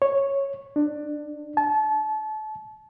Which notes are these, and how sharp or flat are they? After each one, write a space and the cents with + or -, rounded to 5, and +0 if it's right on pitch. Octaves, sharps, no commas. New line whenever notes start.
C#5 -5
D4 +20
A5 -30